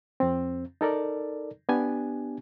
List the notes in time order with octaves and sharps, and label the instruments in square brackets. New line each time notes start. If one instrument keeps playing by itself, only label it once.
[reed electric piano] F2 C4
D#4 A4 A#4 D5
B3 D4 G4 G#5